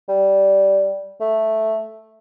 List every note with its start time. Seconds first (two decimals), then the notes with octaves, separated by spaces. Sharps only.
0.09 G3
1.21 A3